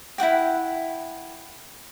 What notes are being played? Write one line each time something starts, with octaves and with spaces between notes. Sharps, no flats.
E4 F4 F#5 G5